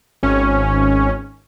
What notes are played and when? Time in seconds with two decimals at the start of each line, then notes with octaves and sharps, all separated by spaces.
0.23 G#1 C#4